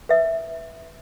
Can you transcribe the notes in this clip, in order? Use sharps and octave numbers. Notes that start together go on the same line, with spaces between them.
B4 E5